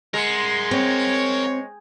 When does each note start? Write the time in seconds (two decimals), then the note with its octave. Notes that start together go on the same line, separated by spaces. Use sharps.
0.14 G#3 A#4 F#5 C6
0.71 C4 C#5